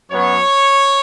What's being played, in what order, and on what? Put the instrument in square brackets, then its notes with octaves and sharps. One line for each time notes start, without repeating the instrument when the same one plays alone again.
[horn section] F#2 F#3 B3 C#5